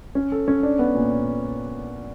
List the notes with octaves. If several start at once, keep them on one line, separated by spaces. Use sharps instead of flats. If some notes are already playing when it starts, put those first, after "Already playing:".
C#4
A4
C#4
D4
B3
A#2